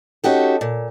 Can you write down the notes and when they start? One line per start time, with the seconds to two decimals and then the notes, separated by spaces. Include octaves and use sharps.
0.24 C#4 D#4 F#4 G4 A4
0.61 A#2